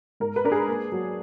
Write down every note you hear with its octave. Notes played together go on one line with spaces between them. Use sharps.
G#2 A#4
B4
D4 A#4
G#4
A#3
F#3